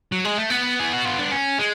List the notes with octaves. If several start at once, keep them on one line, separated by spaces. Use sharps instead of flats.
F#3
G#3
A3
B3
G#4
F#4
F4
D4
C#4
G#3